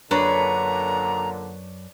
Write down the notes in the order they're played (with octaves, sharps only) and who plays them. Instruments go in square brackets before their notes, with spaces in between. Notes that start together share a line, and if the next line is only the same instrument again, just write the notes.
[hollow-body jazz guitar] F#2 [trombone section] A#2 D3 [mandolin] D4 B4 C#5 [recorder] A#5